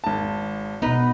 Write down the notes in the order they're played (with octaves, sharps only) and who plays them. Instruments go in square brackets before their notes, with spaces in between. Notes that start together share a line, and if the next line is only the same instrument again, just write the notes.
[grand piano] G#1 A5
[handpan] B2 B3 [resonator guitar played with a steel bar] D#4 B4